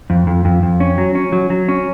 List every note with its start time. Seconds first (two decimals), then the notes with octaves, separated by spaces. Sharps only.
0.10 F2
0.27 F2
0.45 F2
0.63 F2
0.80 C#4
0.98 F#3
1.15 C#4
1.32 F#3
1.50 F#3
1.69 C#4